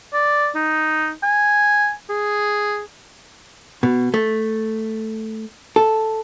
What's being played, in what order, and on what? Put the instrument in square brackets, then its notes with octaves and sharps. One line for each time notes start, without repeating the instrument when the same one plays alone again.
[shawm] D5
D#4
G#5
G#4
[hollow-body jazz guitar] B2
A3
A4